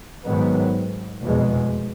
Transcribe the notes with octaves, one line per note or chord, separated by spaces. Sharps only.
G#2 D#3 F#3 B3
F1 E2 B2 G#3